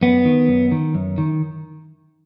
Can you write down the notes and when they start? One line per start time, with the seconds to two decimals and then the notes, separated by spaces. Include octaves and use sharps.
0.01 F#2 B3
0.25 D#3
0.48 F#2
0.71 D#3
0.95 F#2
1.18 D#3